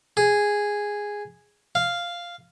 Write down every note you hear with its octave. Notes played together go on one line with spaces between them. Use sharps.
G#4
F5